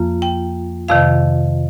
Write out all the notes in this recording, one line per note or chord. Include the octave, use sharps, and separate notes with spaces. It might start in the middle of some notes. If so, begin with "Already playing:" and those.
Already playing: F2 F3 A#3 F4
G5
F2 C3 D#3 F5